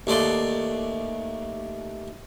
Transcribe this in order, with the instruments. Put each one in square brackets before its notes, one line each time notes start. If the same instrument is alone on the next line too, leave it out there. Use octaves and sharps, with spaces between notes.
[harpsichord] D#2 A3 D5 C6